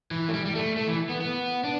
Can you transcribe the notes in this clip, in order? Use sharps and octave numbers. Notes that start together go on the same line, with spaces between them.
E3
A3
G3
G3
A3
A3
E3
B3
B3
D4